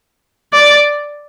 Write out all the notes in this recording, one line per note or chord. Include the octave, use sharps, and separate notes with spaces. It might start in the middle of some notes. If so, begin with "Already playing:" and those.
D5